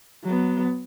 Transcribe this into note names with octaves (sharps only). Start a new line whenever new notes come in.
F#3 B3